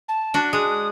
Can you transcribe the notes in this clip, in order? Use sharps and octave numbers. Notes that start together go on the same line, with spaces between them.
A5
D4 F#4
G#3 D#6